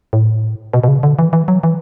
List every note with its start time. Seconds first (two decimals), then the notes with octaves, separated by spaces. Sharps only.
0.13 A2
0.73 B2
0.84 B2
0.88 C#3
1.03 D3
1.19 E3
1.33 E3
1.48 F#3
1.63 E3